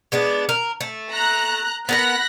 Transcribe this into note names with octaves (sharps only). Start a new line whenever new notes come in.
G#3 B3 D4
A#4
A3
A#5 F#6
B3 A#4 F#5 B5 F#6 A#6